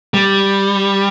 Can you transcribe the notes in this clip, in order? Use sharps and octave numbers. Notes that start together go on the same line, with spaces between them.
G3